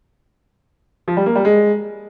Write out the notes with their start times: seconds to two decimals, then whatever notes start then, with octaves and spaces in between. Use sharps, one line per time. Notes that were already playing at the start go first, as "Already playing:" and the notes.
1.08 F3
1.17 G3
1.26 A#3
1.35 G3
1.45 G#3